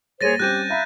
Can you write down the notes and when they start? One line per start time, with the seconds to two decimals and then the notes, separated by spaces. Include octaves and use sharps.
0.21 G3 A#3 G#4 C5 C#5 A6 A#6 D#7
0.39 G3 C4 C#4 G4 F#6 G6 D#7
0.70 E5 F5 A#5 B5